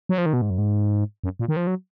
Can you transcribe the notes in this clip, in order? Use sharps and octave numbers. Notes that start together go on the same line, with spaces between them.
F#3
F3
D#3
B2
G#2
F#2
G#2
F#2
A#2
D#3
F3
F#3